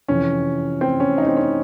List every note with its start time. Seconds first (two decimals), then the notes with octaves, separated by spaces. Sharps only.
0.08 F2 C3 E3 C#4
0.81 C4
1.00 C#4
1.18 D#4
1.27 C4
1.37 C#4